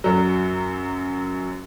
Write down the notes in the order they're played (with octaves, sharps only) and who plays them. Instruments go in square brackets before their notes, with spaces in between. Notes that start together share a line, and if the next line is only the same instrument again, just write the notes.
[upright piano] F#2 F#3